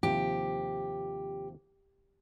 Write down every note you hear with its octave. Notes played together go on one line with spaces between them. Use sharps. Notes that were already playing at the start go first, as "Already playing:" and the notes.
D#2 C3 F3 G4